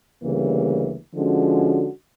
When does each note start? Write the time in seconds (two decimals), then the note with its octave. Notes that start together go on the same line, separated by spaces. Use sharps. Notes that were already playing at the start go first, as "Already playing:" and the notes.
0.23 D2 C#3 E3 G3 A#3
1.15 D3 F3 G#3 C#4 F#4